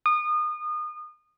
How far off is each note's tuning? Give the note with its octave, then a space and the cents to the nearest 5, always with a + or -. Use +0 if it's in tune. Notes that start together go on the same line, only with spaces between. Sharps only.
D#6 -30